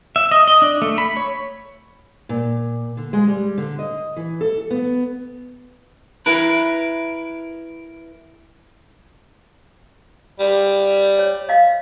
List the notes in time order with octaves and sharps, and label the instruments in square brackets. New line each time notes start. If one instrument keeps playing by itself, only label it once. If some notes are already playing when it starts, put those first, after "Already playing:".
[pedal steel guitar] E5
D#5
D#5
D4
A3
B5
C#5
[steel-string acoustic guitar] A#2
D3
G#3
G3
D3
D#5
E3
A4
B3
[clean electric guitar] E4 A#4 B4
[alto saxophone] G3
[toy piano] C#5
D#5 F5